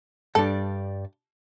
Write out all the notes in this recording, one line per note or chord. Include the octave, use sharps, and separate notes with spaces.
G2 G3 D4 A4